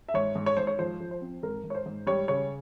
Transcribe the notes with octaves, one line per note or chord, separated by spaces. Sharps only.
E5
G#2 C#5
G#2
C#5
G#2 C5
C#5
F3 C5
F3
C5
C4
G#2 A#4
G#2
C#5
C5
G#2
G3 C#5
C#3 C#5